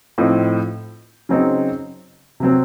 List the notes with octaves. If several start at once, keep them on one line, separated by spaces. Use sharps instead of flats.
A2 F3 C4 D#4
C#3 F#3 C4 D#4
C3 F#3 C4